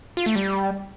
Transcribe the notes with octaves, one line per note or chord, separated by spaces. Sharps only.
F4
A3
G3